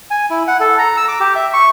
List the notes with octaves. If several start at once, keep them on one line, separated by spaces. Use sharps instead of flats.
G#5
E4
F#5
A4
A#5
E6
D6
G4
E5
C#6